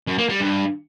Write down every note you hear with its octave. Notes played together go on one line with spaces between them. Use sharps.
F#2
A#3
G3
G2